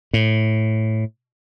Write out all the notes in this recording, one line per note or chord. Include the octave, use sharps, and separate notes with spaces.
A2